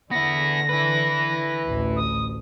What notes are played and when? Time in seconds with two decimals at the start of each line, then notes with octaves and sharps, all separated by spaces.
0.11 D3 B3 E4 A#6
0.69 E4 B4
1.65 A1 D2
1.96 D#6